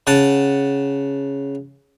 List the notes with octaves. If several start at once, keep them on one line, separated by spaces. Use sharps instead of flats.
C#3 F#5 A5